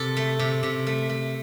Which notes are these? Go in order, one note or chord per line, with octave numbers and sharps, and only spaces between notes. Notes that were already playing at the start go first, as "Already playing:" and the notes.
Already playing: C3 A4
A3
C3
C3
A3
A3